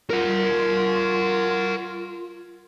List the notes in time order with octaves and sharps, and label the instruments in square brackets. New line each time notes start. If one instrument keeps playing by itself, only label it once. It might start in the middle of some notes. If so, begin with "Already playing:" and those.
[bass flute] F4 [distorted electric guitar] A#4 F#5